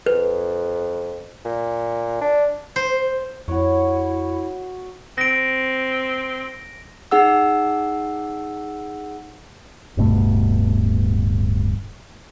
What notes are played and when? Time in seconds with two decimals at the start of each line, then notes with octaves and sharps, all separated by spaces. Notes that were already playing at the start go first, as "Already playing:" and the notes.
0.06 F2 B4
1.45 A#2
2.21 D4
2.76 C5
3.48 F2 E4 F#4 C#5
5.18 C4 A#6 D7
7.11 D#4 G#4 F#5 E6
9.97 D1 G2 B2 A3